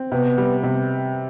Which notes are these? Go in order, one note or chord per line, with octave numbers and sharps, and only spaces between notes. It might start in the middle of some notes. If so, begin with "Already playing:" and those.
Already playing: C4
C3 B3
G3
C3